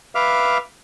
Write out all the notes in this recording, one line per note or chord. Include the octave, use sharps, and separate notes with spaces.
B4 E5 F5 D6 F6